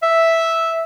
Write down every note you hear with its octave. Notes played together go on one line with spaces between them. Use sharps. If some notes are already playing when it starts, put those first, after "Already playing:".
E5